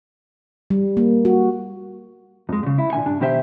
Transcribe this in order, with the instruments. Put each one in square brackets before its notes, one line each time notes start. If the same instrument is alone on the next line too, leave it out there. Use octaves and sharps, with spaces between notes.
[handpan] G3
A#3
F#4
[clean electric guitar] F2 G#3
A#2 C#3
E4
A#2 D3 G#5
G2 D4
B1 B2 D#3 G4 C5 E5